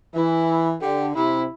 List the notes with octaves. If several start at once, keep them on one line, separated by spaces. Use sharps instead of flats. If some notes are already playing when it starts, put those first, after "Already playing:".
E3 E4
D3 G4
C3 E4